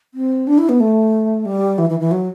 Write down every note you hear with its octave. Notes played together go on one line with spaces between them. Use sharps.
C4
D4
E4
B3
A3
G3
E3
E3
E3
F#3